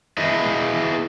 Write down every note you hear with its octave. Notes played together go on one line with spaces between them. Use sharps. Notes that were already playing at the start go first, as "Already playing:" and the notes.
E4 G#4 B4 D#5 E5